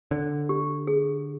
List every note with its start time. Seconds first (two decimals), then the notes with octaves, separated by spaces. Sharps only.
0.11 D3 D5
0.49 G4
0.87 G#4